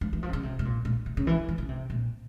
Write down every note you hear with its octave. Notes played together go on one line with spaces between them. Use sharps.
F3
E3
F3
C3
C#3
C3
C3
A#2
A#2
C3
C#3
E3
E3
C#3
C3
A#2